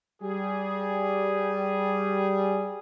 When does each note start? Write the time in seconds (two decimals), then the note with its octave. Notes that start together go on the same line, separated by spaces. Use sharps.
0.21 G3 G#4